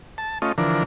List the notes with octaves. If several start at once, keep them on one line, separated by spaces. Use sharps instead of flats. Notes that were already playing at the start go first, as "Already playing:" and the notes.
A5
A3 C#4 F4 D#5
D3 E3 F3 D4 A#4